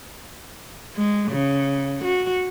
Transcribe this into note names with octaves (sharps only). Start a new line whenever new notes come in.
G#3
C#3
F#4